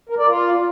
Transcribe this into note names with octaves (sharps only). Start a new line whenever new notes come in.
A#4
D5
F4